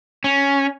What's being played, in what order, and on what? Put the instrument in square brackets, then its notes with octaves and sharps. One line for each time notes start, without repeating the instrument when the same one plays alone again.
[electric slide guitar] C#4